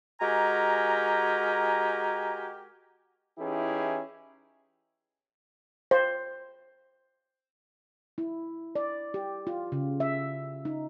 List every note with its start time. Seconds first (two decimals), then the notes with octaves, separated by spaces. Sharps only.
0.21 G#3 F#4 G4 A#4 G#5 A#5
3.38 E3 C#4 D#4 E4 G4 G#4
5.91 C5
8.18 E4
8.75 D5
9.14 G4
9.47 F4
9.72 C#3
10.00 E5
10.65 D#4